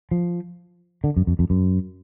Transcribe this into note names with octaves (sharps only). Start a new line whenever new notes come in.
F3
D3
F#2
F2
F2
F#2